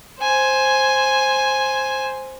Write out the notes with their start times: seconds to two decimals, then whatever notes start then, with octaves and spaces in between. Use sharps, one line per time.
0.21 C5 G#5